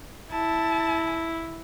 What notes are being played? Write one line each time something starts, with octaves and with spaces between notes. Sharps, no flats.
E4 A5